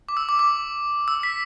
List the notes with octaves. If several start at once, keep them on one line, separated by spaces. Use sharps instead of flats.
D6
E6
D6
D6
E6
B6